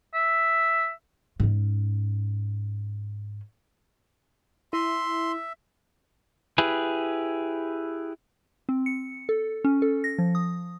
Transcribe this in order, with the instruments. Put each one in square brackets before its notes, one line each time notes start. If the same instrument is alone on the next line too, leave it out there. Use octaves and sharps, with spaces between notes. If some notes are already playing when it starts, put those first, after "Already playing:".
[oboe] E5
[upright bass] G#2 C#4
[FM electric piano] E4 [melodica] E5 [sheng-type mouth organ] C6
[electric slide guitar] E4 G4 G#4 B4
[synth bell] C4
C#7
A4
C#4
A4
A#6
F3
D#6